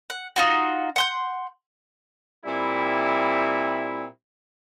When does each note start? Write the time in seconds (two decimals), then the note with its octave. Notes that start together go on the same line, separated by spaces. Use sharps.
0.10 F#5
0.36 D#4 F4 F#4
0.96 F#5 C6 G6
2.45 A#2 G3 C4 E4